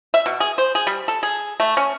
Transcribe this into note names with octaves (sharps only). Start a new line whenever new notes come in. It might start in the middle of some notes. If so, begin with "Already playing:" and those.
E5
B2
G#4
C5
G#4
G3
A4
G#4
A3
C#4